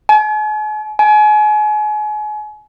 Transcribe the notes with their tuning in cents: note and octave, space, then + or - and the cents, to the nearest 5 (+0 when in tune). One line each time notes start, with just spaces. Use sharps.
G#5 +45
G#5 +35